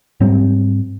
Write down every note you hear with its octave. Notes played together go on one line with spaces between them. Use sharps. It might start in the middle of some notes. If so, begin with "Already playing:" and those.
G#2 F#3 G3 C4